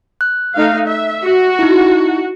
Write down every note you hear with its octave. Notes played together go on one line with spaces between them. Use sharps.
F#6
A3 D#4 F5
E5
F#4
D#4 E4